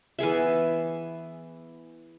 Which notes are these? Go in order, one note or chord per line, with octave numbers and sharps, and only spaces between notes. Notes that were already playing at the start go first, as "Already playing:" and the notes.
E3 B3 G#4 E5